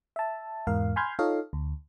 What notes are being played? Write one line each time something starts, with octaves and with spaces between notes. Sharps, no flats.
E5 A5
E2 G#2 A#4 F5
G#5 B5 C6 F6 G6 G#6
D#4 F4 A4 C#5 D#5 F5
D2